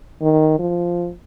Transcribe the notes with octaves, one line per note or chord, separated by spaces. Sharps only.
D#3
F3